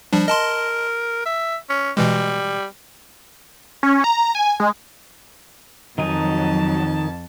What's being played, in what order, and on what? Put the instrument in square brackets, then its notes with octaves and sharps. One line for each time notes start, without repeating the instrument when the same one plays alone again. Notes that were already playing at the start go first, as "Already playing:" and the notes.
[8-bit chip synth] F3 G3 D4
[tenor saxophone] A#4 [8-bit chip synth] D#5 A5 C6
[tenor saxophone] E5
C#4
[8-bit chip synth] B2 E3 G#3 [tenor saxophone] G3
[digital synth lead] C#4
A#5
G#5
G#3
[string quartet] F2 A5 [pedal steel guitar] D#3 D#4 G#5 [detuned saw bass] F#3